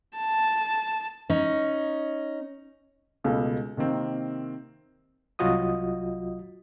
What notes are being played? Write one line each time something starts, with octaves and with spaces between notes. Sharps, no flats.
A5
C#4 D#4
C#2 B2 A3
C3 D#3 A#3 C4
C2 F#3 F4 F#4 D#5 D#6